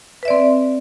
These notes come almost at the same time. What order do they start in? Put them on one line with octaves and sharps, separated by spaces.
B4 E5 D5 C4